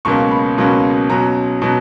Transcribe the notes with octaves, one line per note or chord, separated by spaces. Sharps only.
C#2 B2 F#3 A#3 C#4 C#6
B5
C#2 B2 F#3 A#3 C#4
B2 F#3 C#4 A#5
B2 F#3